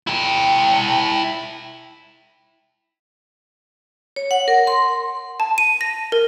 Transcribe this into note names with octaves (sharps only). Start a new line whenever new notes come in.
E4 G5
C#5
F#5
A#4
C6
A5
D#7
A#6
A#4